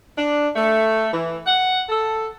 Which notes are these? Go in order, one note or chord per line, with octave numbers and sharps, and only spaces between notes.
D4
A3
E3
F#5
A4